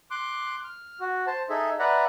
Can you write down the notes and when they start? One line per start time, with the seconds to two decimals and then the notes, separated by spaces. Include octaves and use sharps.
0.11 C6 D6 F#6
0.64 F6
1.00 F#4
1.27 C5 A5
1.49 D#4 G#4 A4 E5
1.79 B4 D5 E5 F#5 A#5